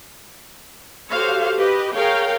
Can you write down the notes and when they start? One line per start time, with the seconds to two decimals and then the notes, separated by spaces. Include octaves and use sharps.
1.09 F#4 G4 A4 C5 C#5 F5
1.58 G4 B4 D#5
1.95 G#4 A#4 C#5 F5 G5